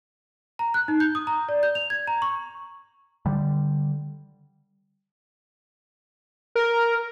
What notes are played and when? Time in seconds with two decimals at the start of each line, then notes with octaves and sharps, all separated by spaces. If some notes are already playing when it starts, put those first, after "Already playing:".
0.59 A#5
0.74 F#6
0.88 D#4
1.00 G6
1.15 D#6
1.27 A#5
1.49 D5
1.63 G6
1.75 F7
1.90 G#6
2.07 A#5
2.22 C#6
3.26 D3 G3
6.55 A#4